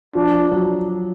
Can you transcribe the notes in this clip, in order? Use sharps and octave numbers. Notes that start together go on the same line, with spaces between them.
F3 D4
F#3